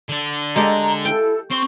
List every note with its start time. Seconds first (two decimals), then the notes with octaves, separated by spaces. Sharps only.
0.09 D3 D4
0.56 G#3 G4 A4 A#5
1.05 E4 A4 G5
1.51 C4 C#6